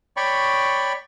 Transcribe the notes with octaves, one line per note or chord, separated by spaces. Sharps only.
C#5 D5 G5 B5 C#6